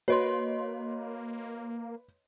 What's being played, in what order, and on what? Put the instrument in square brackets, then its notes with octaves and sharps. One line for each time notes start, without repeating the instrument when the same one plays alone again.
[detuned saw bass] A#3 [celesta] F#4 [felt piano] B4 [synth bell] C#5 D#5 C6